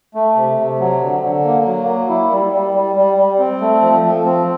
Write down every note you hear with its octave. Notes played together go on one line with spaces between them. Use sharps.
A3
C3
C3
F#3
D3
D3
A#3
F#3
A#3
E4
G3
G3
G3
G3
G3
C4
A3
F3
F3
C4